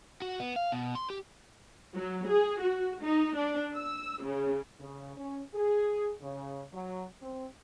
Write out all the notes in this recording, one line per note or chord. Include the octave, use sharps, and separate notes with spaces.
F#4
B3
F5
B2
C6
G4
F#3
G#4
F#4
D#4
D4
E6
C#3
C#3
C#4
G#4
C#3
F#3
C4